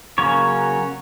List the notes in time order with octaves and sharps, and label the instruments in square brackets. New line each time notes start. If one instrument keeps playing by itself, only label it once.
[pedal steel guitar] C#3 F#3 A#3 C#4 C#5